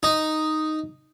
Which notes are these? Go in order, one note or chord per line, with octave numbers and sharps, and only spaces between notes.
D#4